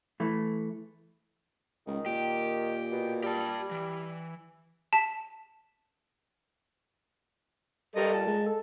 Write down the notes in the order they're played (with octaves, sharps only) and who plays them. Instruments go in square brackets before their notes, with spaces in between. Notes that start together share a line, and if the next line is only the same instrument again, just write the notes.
[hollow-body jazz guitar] E3 A3
[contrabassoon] C#2 [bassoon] D#3
[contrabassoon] A#2 [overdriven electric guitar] G4
[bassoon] B2
[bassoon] G3 [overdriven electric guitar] G4 A5
[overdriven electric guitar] E3
[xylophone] A5 B6
[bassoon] G2 [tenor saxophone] G3 [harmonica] A4 A#4 D#5
[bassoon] A#2 [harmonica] A5
[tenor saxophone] G#3
[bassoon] A4